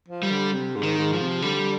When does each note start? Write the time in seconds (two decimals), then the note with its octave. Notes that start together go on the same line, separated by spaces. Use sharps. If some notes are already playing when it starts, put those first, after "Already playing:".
0.09 F3
0.23 G3
0.31 D3
0.53 C3
0.75 G#2
0.83 D#3
0.98 G#2
1.13 F3
1.21 C3
1.42 D3 G3